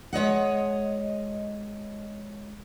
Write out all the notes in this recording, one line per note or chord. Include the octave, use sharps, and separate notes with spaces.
G#3 C#5 D#5 F#5